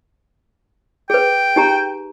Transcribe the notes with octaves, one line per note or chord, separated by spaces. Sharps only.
G#4 B4 G5
D#4 G4 A#5